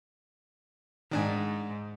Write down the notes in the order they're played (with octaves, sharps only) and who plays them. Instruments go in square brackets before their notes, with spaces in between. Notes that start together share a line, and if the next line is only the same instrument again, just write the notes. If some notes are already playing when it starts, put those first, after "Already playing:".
[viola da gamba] G#2 [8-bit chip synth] D#3 D4 G#5